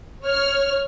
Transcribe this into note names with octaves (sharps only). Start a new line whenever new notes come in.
C#5 F6